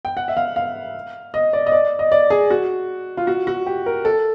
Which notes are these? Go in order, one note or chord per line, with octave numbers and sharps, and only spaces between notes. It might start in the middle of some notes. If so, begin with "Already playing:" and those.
G5
F#5
E5
F5
F5
D#5
D5
D#5
D5
D#5
D5
G#4
F#4
F4
F#4
F#4
G4
A#4
A4